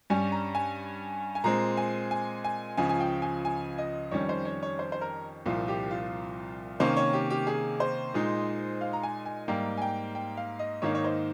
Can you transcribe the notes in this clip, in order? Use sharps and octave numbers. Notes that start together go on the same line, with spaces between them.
G2 G3 C#4 G#5
A#5
G#5
G#5
A#2 G#3 C4 A#5
G#5
G#5
G#5
C#2 C#3 F3 G#5
G#5
G5
G#5
G#5
D#5
F2 D#3 G3 C#4 C#5
C5
C#5
C#5
C5
C5
A#4
C2 A#2 F3 F4
G4
F4
C3 D#3 A#3 C#4 C5
C#5
G4
G4
G#4
C5
A#2 G#3 D#4
F5
A#5
G#5
G#5
G#2 G3 A#3 G5
G#5
G5
G5
F5
D#5
G#2 D#3 A#3 D#4 C#5
C#5
C5